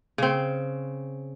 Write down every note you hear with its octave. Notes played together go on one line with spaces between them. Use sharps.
C#3 C4